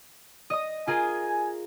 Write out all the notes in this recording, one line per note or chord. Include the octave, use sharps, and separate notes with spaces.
D#5 D#6
F4 G#4 A#4 G#5